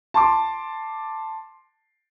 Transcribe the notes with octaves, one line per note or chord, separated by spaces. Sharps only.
A5 C6 D6